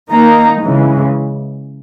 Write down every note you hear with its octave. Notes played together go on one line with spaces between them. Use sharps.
D#3 A#3 D#4 A#5
C#3 E3 G#3